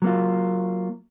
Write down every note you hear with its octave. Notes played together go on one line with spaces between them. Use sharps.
F#3 A#3 F4